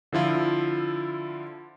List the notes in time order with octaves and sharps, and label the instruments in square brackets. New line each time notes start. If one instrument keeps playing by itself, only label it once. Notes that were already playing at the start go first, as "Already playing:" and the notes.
[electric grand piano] D3 F3 E4 F4